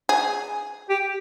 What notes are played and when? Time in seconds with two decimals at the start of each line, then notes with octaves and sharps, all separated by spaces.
0.09 G#4
0.89 G4